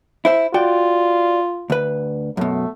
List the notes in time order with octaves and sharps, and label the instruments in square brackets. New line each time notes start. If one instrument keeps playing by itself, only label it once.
[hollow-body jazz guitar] E4 C5 E5
[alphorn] F4 [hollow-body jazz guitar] F#4 D5 G5
[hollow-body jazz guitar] D2 B4
[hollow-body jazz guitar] F#2 B2 [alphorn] A3